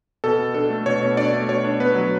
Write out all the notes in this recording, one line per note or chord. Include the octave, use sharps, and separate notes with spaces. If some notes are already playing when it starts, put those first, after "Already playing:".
B2 A4
B2
D4 A4
A3
B2 C#5
B2
D4 D5
A3
B2 C#5
D4
B3 B4
F#3